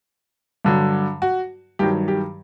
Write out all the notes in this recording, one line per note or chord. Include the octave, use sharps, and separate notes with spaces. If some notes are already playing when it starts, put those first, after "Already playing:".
G2 D3 F#3
F#4
G2 D#3 F#3 G4
G4